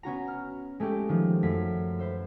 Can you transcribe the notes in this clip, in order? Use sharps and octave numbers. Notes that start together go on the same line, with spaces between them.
B3 C#4 F#4 A#5
F6
G#3 A3 C#4 G4
D#3 F3
F#2 A3 B6
B4 C5 E5